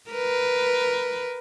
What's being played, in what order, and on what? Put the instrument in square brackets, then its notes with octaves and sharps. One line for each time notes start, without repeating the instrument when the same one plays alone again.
[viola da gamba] A#4 B4